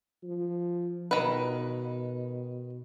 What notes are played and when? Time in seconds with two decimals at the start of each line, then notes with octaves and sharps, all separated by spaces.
0.24 F3
1.11 B2 D#3 B4